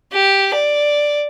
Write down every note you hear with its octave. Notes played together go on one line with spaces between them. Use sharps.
G4
D5